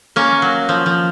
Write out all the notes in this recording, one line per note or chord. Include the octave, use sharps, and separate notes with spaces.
A#3 C#4
F#3
F3
F3